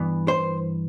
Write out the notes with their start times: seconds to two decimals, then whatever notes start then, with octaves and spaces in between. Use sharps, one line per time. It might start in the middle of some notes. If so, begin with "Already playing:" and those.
Already playing: G2 E3 B3
0.28 C5